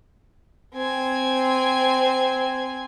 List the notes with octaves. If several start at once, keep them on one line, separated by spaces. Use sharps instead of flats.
C4 G#5